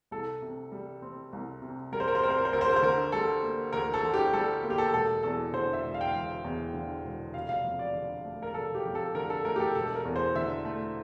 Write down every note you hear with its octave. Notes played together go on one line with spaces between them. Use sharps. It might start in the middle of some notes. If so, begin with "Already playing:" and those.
C2 A4
C3
G3
C4
C2
C3
G3 A#4
C5
A#4
C5
C4 A#4
C5
A#4
C5
D2 A#4
C5
A#4
C5
D3 A#4
G3 A4
A#3
D2 A#4
A4
D3
G4
G3 A4
A#3
G4
A4
E1 A4
E2 A4
D3 C5
E5
E1
F5
G5
F5
E1
E2
D3
E1
F1 F5
F5
F2
D5
D3
A3
A#4
F1 A4
G4
F2
A4
D3 A#4
A4
A3 A#4
G4
A4
E1 A4
A#4
E2
C5
D3 E5
A3